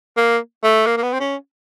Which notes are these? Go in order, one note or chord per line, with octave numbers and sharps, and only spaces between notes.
A#3
A3
A#3
A#3
B3
C4
C#4